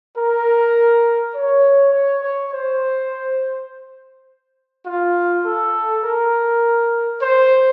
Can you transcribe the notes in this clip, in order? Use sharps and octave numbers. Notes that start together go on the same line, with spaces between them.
A#4
C#5
C#5
C#5
C5
F4
A4
A#4
C5